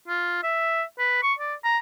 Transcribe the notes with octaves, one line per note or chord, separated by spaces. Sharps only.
F4
E5
B4
C#6
D5
A#5